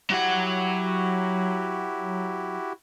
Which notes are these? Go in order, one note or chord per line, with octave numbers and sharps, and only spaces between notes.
F#3 E4 F#4 G4 F#5